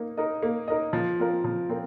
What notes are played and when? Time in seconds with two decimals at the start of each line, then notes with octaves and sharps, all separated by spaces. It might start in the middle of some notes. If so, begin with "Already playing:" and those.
Already playing: A#3 D#4
0.17 D#4 A#4 D#5
0.43 A#3
0.68 D#4 A#4 D#5
0.93 F3
1.19 C4 F4 A#4
1.44 F3
1.69 C4 F4 A#4